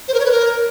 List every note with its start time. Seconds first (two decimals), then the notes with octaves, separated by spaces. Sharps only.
0.08 C5
0.14 A#4
0.20 C#5
0.26 B4
0.31 A#4